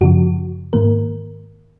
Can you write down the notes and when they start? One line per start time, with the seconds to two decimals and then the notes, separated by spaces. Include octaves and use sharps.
0.01 F#2 C#3 F3 F#4
0.73 G#2 D#3 A#3 A#4